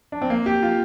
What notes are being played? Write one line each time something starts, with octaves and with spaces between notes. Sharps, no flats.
D4
C4
A#3
G4
F4